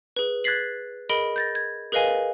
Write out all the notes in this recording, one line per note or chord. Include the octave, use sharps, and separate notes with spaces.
G#4 B4
F#6 G#6 A6 B6 C7 F#7
G#4 A#4 D#5 B5 D7 G7
G6 A6 A#6
G#6
G#4 A#4 B4 D#5 F5 G#5